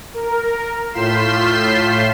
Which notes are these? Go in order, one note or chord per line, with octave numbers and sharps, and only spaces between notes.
A#4
A2 F4 G6 B6 C7 E7